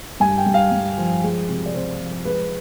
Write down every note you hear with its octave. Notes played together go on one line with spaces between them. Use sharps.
G2 G#5
G5
G2
F5
G2
F3
G#3
C3
D5
C3 C5
F3
G#3 B4